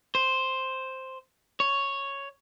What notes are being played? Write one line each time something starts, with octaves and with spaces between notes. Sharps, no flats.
C5
C#5